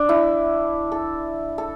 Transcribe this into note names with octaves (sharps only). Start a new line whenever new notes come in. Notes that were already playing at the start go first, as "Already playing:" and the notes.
Already playing: D4
E4
A4
A4